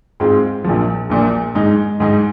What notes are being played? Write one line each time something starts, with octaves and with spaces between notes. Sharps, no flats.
G#2 G#3 C4 F4 G#4
A#1 A#2 F3
A#1 A#2 F3
G#2 G#3 D#4 G#4
G#2 G#3 D#4 G#4